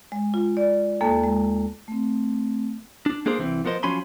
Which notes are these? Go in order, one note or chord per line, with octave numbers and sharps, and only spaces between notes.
G#3
F4
D5
D#2 A#3 A4 A5
G#3
A3 C4
D4
A#3 D4 G#4 A#4 C5
C2 E3 C4
F3 B3 A#4 C5 D#5
F3 F#3 C#4 G#5 B5 C6